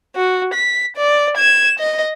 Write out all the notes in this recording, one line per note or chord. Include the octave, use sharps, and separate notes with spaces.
F#4
B6
D5
G#6 E7
D#5